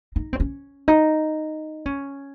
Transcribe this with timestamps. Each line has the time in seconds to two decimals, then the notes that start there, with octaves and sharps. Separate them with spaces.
0.16 D#4
0.33 C4
0.40 C#4
0.88 D#4
1.86 C#4